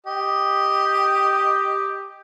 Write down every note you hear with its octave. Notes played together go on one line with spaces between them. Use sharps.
G4 D#5